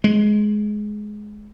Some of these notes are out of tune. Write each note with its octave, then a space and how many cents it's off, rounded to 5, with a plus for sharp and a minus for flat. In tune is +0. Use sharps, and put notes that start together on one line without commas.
G#3 +15